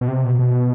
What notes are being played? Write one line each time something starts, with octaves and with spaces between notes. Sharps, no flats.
B2
C3
B2
B2